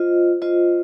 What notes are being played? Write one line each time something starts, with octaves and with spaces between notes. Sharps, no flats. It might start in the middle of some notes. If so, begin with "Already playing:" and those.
Already playing: F4 C5 D#5
F4 C5 D#5